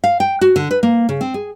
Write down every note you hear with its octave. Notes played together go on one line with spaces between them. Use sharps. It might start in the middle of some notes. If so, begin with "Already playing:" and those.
F5
G5
F#4
D3
B4
A#3
C#3
C4
G#4